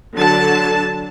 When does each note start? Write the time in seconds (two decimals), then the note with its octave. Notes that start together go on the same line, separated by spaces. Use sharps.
0.16 D3 F#3 A5